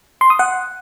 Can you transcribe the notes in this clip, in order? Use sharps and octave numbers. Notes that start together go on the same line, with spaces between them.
C6
D#6
F#5